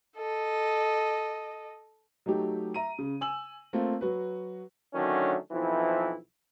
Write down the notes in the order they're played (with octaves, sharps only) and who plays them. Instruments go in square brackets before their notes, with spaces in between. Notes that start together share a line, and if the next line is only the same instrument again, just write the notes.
[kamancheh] A4 D#5
[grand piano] F#3 A3 D#4 G4
E5 A#5 D#7
C#3
G#5 E6 F#7
A3 A#3 C4 F4
F#3 F#4 B4
[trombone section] D3 D#3 F#3 A3 C#4 D4
B1 E3 F3 C4 E4